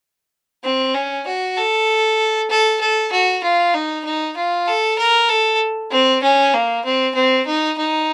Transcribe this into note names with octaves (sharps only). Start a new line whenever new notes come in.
C4
C#4
F#4
A4
A4
A4
F#4
F4
D#4
D#4
F4
A4
A#4
A4
C4
C#4
A#3
C4
C4
D#4
D#4